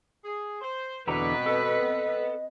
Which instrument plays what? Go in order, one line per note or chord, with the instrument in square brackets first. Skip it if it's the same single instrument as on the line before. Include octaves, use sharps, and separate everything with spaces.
[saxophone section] G#4
C5
[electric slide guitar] E2 D3 A#5 [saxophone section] B2 [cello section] C4 B4
[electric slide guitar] A4 [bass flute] D#5
[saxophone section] B3